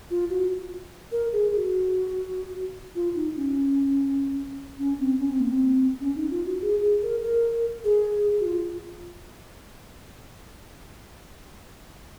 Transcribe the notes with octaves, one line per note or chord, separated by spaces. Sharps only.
F4
F#4
A#4
G#4
G#4
F#4
F4
D#4
C#4
C#4
C4
C#4
C4
A#3
C4
C#4
D#4
F4
F#4
G#4
G#4
A#4
A#4
G#4
F#4
F4